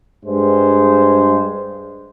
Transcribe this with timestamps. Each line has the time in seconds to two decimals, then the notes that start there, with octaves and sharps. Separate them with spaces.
0.24 G2 G#3 C5